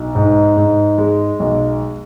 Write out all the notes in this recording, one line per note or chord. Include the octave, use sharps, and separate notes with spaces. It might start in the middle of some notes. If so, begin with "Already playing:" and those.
Already playing: B1
G#2
G#2
G#3
B1